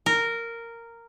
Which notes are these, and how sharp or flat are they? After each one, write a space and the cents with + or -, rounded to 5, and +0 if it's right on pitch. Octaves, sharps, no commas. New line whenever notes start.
A#4 -10